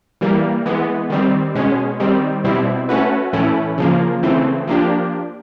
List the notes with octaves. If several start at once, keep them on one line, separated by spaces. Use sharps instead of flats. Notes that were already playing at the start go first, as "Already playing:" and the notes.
E3 G3 A#3
E3 G#3 B3
D#3 G3 C4
B2 G#3 C#4
D#3 G3 C4
B2 G3 C4 E4
A3 C#4 F#4 B4
A2 E3 A3 C#4 E4
C#3 F3 A#3
C#3 E3 A3 C4
F3 A#3 D4 G4